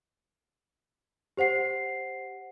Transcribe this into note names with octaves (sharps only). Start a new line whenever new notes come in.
G4 C5 F#5 C7